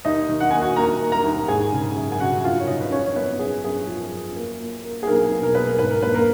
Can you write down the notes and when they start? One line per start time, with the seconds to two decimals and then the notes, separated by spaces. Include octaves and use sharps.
0.05 D#2 D#4 D#5
0.29 D#3
0.40 F#5
0.51 A#3 G#5
0.61 F#4 F#5
0.76 A#3 A#4 A#5
1.00 A#3
1.12 A#4 A#5
1.25 D#2
1.48 G#1 G#4 G#5
1.73 C#3
1.96 F#2
2.12 G#5
2.20 C#3 F#4 F#5
2.44 F#2 F4 F5
2.60 C#5
2.68 C#3 D#4 D#5
2.81 B4
2.92 F3 C#4 C#5
3.06 C#5
3.16 F#2 B3 B4
3.39 F#2 G#4
3.64 F#2 G#4
3.87 F3
4.11 F#2
4.35 A#3
4.59 A#3
4.84 A#3
5.03 G#4
5.07 B1 A#3 A#4
5.31 B2
5.43 A#4
5.55 A#3 B4
5.67 A#4
5.79 G#1 B4
5.91 A#4
6.02 A#3 B4
6.14 A#3 A#4